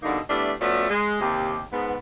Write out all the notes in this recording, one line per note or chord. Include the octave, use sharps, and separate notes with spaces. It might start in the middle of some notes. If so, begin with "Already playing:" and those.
B2 D3 G3 A#3 D#4
G3 A3 B3 D4 E4
F3 A3 B3 C#4 F#4 D5
G#3
D#2 C3 G4
G#2 B3